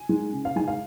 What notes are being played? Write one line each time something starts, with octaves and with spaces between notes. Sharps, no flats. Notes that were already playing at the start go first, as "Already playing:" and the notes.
Already playing: G#5
G#3 D#4
C#3
F5
G#3 D#4 G#5
F5